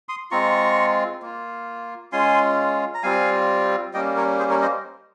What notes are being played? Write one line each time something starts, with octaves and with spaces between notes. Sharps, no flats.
C6 D#6
G#3 C4 F4 A#5 C#6
A#3 F4
G#3 C#4 F4 G#5 C6
A#5
G3 C4 F4 F5 G#5
G3 A#3 C#4 D#5 G5
A#4 C#5
G#4 C5
A#4 C#5
C5 D#5